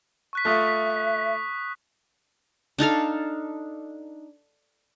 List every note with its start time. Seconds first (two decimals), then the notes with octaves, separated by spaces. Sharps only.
0.33 C#6 F#6 B6
0.45 A3 F4 E5 C#6 D#6 F#6
2.79 D4 D#4 A4 F5